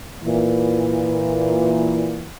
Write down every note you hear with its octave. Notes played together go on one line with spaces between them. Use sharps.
A#2 E3